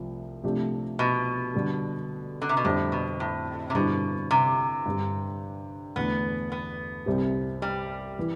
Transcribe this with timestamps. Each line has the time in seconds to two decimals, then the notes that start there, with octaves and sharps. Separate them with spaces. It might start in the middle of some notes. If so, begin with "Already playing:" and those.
Already playing: C2 C3 F3 A3
0.43 C3 F3 A3 D4 G4
0.99 B2
1.54 D3 G3 D4 A4
2.42 D3
2.49 C3
2.57 B2
2.65 F2 A2 D3 G3 C4
2.92 B2
3.20 A2
3.70 C3
3.75 G2 B2 D3 G3 C4 E4
4.31 C3
4.85 G2 D3 G3
5.96 E2 D3 A3 B3
6.52 B3
7.06 C2 C3 G3 C4 G4
7.62 G3
8.19 E3